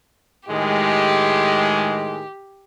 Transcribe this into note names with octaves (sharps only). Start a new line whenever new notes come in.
A2 D#3 G#3 G4